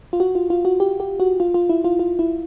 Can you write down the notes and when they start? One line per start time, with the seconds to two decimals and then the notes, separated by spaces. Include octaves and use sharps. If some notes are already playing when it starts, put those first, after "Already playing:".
0.13 F4
0.20 F#4
0.35 F4
0.50 F4
0.65 F#4
0.80 G4
1.00 G4
1.20 F#4
1.40 F4
1.54 F4
1.69 E4
1.84 F4
1.99 F4
2.19 E4